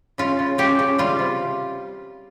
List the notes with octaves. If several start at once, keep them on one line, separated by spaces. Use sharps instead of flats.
C#3 F4
C#3
C#3 G4
C#3
G3 F4
C3